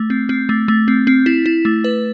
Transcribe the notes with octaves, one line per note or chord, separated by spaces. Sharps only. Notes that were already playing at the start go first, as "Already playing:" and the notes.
Already playing: A3
C4
C4
A3
A3
C4
C4
E4
E4
A3
B4